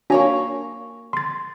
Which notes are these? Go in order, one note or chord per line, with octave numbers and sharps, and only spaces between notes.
A#3 D4 F#4 C#5 G#5 A#5
C6 A6